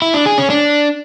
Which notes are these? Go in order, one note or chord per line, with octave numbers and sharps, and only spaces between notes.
E4
D4
G#4
C#4
D4